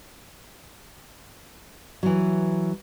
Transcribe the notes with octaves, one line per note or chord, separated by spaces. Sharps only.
E3 F#3